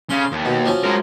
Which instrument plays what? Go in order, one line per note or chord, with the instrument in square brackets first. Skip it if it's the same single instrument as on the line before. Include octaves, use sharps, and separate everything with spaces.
[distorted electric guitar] C#3 [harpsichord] F5 C6
[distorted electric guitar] D#2
[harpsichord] B2
F3 F#3 C#4
[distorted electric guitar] G#3 A#4